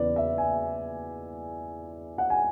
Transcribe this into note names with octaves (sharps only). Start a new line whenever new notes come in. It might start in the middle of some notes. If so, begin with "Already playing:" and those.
Already playing: E2 C#3 E3 B4 D5
E5
G#5
F#5
G#5